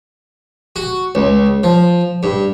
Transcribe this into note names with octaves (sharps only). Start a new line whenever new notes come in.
F#4
C#2
F3
G2